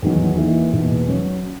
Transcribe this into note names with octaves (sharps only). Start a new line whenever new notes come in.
E2 D#3 F#3
E3 A#3 D#4
E2 B2 A#3 D#4
F#3 C#4 F#4 C#5